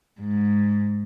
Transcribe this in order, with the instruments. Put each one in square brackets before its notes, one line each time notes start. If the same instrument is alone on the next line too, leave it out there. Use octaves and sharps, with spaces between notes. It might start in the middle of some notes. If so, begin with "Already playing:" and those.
[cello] G#2